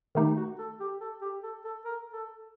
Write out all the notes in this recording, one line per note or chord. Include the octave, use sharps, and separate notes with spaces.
D#3 A3 D#4 G4
F#4
A4
G4
A4
G4
A4
A4
A#4
A4